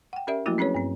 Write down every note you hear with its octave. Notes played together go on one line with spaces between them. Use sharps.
F#5 G5
C#4 G4 A#4 D5 E5
F3 F#3 A3 A#3 E4 F#4
C4 C#4 G#4 B4 C#5
G2 C4